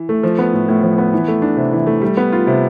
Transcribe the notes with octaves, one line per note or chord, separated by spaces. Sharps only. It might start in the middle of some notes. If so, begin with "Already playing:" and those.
Already playing: E3
A3
F3
B3
A2
A2
F3
B3
E3
A3
D4
C3
E3
A3
G3
B3
F4
C3